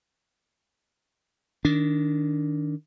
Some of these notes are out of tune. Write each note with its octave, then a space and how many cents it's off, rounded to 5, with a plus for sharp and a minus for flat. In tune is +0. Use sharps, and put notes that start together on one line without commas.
D#3 +0 D4 -20